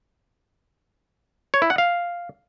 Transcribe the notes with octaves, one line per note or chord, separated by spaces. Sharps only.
C#5
E4
F#5
F5